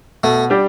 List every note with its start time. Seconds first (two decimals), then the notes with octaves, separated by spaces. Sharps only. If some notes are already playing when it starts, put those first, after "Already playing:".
0.24 B2 A3
0.50 G3 D4 G4